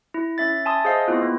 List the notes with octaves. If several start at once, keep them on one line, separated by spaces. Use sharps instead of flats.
E4
C#4 E5 A6
E5 G#5 A5 C6 D#6 A6
G#4 C5 D#5 F5 D#6
B3 C4 E4 F4
A#3